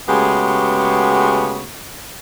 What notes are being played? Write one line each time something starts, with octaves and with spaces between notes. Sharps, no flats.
C#3 G#3 A3 B3 F#4 G4